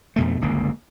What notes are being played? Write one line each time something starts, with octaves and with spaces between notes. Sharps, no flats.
F2 B2 A3
D1 G1 C#2 A#3